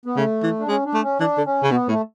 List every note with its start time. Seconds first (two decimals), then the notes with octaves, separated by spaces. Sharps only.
0.06 B3
0.16 C#3 A3
0.43 E3
0.59 D4
0.68 G#3 C#4
0.85 D4
0.94 A3
1.03 C#4
1.20 E3 D4
1.37 D3
1.46 C#4
1.63 C#3
1.71 B2 B3
1.88 A2 A3